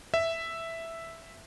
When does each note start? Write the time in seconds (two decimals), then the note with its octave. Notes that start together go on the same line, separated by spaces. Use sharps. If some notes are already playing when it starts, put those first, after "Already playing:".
0.14 E5